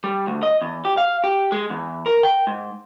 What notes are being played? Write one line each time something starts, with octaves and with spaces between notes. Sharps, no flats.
G3
D2
D#5
E2
G4
F5
G4
G#3
E2
A#4
G5
G#2